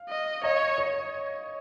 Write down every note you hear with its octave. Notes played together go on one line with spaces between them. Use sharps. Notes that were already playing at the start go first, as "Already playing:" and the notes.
Already playing: F5
D#5
C#5 D#5
C#5